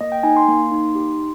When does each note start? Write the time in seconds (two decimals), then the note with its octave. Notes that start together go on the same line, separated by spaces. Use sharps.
0.01 A#3 D#5
0.12 G5
0.23 D#4 G#5
0.37 C6
0.49 A#3
0.71 D#4
0.95 G4